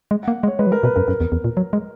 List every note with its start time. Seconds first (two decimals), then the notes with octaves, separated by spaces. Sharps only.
0.11 G#3
0.23 A#3 F#5
0.43 G#3
0.48 C#5
0.59 G#3 B4
0.67 F#3
0.72 G#3 A#4
0.83 B2 B4
0.96 F#2 A#4
1.08 F#2 A#4
1.21 E2
1.32 E2
1.44 A#2
1.57 F#3
1.73 G#3